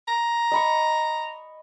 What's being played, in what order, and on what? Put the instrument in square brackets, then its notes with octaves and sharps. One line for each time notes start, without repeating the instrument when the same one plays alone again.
[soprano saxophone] A#5
[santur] D#5 B5 C#6